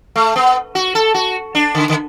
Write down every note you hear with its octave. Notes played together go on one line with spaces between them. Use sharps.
A3
B3
F#4
A4
F#4
D4
D3
D3